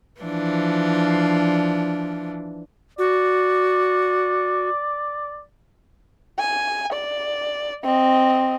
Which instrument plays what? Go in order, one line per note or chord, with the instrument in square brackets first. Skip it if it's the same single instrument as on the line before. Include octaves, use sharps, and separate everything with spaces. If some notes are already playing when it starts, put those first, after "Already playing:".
[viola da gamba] E3 F3 D4
[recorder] F#4 [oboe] D5
[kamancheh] G#5
D5
C4 D#5